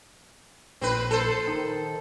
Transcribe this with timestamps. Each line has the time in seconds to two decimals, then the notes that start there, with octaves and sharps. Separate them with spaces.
0.81 A#1 C4 B4
1.11 A4 C5
1.47 D#3